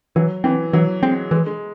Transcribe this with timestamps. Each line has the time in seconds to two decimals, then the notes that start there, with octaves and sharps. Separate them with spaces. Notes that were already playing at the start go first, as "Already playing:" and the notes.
0.16 E3 F#3
0.44 E3 C4
0.73 E3 F#3
1.03 G#3 C4
1.31 E3 G#3
1.46 G#3